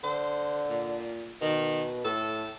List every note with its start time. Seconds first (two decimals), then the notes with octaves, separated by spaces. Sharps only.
0.04 D3 C5
0.70 A#2
1.41 B2 D#3
2.04 A2 A4